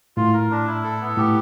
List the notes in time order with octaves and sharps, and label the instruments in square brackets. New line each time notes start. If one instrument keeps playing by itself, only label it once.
[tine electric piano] A2 [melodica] F4
[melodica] A#4
D4
E4
A4
B3
[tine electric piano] A2 [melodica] G4